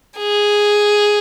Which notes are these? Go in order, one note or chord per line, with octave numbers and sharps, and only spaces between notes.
G#4